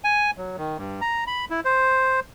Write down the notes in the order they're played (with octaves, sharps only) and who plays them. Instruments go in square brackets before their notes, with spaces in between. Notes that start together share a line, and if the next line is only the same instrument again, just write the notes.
[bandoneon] G#5
F#3
D#3
G2
A#5
B5
E4
C5